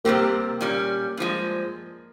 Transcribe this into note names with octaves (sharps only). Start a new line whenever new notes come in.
C3 G3 A#3 C4 G4
A#2 G3 C#4
G2 F3 G#3